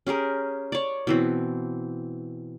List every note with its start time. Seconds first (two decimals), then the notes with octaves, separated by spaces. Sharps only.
0.07 C#4 G4 G#4 A#4
0.72 C#5 D5
1.07 B2 E3 C4